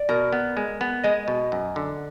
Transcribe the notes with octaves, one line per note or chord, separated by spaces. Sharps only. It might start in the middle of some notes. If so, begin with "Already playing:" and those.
Already playing: D5
B2 A#4
B3
G#3
B3
G#3 D#5
B2
F#2
D3